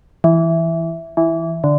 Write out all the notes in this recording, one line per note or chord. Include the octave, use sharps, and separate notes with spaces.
E3
E3
D3